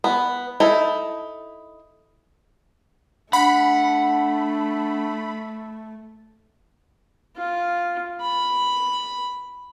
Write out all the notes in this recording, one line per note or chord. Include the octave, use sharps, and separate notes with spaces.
B3
D#4 E4 A4
A3 D4 F#5 B5
F4
B5